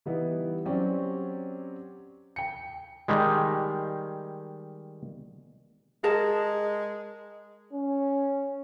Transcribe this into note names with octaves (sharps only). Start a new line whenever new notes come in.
E3 G3 B3 D#4 E4
F#3 C4 C#4 G4 D5
G5 C#7
D#3 G3 G#3
G#3 G#4 A#4 A5
C#4